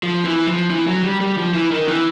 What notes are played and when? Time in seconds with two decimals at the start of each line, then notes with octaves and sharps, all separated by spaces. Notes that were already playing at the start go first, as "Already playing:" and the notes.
0.03 F3
0.25 E3
0.48 F3
0.70 E3
0.87 F#3
1.04 G3
1.21 G3
1.37 F3
1.54 E3
1.71 D#3
1.88 E3